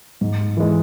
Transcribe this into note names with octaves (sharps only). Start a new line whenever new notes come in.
G#2
E3 G#3